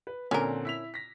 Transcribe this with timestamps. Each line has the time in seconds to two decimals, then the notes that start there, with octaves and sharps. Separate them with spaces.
0.07 B4
0.31 A#2 D3 C4 C#4 A#4
0.65 E4 B6 F7
0.94 A#6 B6